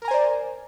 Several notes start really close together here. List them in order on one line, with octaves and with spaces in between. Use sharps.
A#4 A#5 G#5 C5 D5